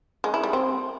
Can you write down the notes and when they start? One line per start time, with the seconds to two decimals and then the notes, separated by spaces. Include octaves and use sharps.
0.24 G#3
0.34 E4
0.43 G3
0.53 C4